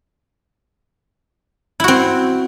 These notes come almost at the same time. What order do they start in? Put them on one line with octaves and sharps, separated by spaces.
E4 F#4 C4